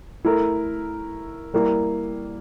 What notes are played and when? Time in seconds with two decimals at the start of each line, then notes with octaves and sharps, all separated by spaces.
0.25 A3 E4 A#4
1.54 G3 A#3 E4 A#4